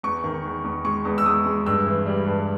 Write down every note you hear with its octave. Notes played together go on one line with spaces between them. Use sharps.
E2 C#6
D#3
E2
E2
G#3 C#6
E2
E6
E2 D#6
G#3
G2 E6
E3
G3
G2